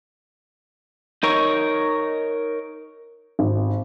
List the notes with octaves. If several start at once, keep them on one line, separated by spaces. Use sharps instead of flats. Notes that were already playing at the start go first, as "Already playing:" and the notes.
D#4 A#4 C#5
G#1